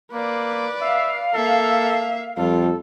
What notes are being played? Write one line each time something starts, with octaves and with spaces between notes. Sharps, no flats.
A#3 B4 D5
E5 F5
A#3 A4 E5
F2 G3 F4 A4